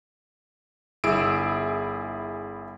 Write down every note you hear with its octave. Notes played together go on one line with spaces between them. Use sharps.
G1 E4 G#4 E6 D7